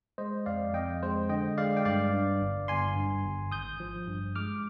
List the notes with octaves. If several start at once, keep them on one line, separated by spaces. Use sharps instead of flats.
G#3 C5 D#5
F2 D5 F5
F2 D#5 G5
G#3 C5
D3 D#5 G5
G#3 D5 F5
G5
G2 D5 F5
G2
G1
G1 G#5 C6
G2
G1
G#1 D#6 G6
F3
G2
G#3 D6 F6